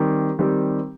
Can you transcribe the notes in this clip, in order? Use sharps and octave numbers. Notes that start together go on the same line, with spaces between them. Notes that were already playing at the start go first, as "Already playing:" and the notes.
Already playing: D#3 G3 C4 G4
D#3 G3 C4 G4